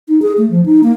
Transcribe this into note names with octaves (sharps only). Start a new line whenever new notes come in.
D#4
G#4
A3
F3
D#4
A#3